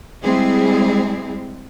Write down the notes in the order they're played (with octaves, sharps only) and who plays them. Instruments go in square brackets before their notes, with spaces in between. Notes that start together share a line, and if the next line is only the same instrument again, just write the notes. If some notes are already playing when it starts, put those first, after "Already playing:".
[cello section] G3 G#3 C4 E4 G#4